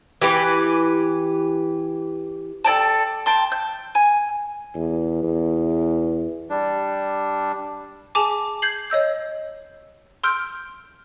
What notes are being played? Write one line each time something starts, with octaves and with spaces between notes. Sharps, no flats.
E3 G4 B4
A4 D5 G5 A5
G5 A5 C6
G6
G#5
E2
E2
G3 D4
G#4 G#5 A5 D6
G6 G#6 C7 F#7
C#5 D#5 E6 G6
C6 E6 F6 G6 D7